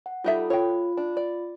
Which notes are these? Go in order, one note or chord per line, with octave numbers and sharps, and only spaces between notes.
F#5
G3 D#4 F4 A4 E5
F4 C#5 G5
D4
D5